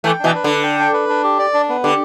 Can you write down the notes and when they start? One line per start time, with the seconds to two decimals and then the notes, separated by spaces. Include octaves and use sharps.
0.04 E3 A3 G5
0.20 B2 E3 D4
0.34 B4
0.44 D3
0.50 D4
0.63 G5
0.79 D4
0.93 B4
1.09 D4
1.24 G4
1.39 D5
1.54 D4
1.69 B3
1.84 D3 G4